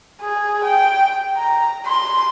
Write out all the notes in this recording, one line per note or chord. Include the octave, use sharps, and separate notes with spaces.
G#4
G5
A#5
C6